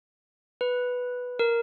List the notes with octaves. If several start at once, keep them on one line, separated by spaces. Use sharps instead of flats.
B4
A#4